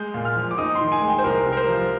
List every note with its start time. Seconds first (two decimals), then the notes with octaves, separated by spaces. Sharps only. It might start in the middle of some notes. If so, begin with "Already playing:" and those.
Already playing: G#3 G6
0.14 A#2
0.25 F6
0.36 F3
0.51 D6
0.58 D#4 D#6
0.75 C6
0.81 D#3
0.92 G#5
1.02 G#3
1.08 G5
1.18 C5
1.24 C2 A#4
1.46 C3
1.52 A#4
1.57 C5
1.68 F3